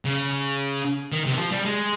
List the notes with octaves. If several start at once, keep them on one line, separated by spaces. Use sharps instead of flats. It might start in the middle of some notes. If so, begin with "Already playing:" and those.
C#3
D#3
C3
D#3
F3
G3
G#3